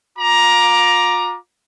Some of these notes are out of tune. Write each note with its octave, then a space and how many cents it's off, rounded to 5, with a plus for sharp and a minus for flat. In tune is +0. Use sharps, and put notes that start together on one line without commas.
F4 +35 A#5 +15 D6 +5